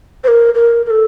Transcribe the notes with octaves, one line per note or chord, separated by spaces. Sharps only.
C5
A#4
A#4
A#4
A4